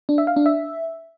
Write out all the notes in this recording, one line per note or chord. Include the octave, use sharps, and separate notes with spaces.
D4
E5
F5
D4
E5